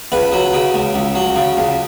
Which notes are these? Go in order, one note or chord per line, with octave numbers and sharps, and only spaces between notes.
C#2 B4
F#3
C#3
C#2
C#2
F#3
C#3
C#2